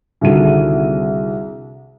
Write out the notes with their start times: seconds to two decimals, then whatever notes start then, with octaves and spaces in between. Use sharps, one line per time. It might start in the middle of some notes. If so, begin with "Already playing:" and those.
0.21 C2 D3 D#3 F#4 G#4 D#7